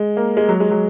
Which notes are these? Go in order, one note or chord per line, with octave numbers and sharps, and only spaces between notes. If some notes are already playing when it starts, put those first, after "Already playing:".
Already playing: G#3
A#3
G#3
F#3
G#3
F#3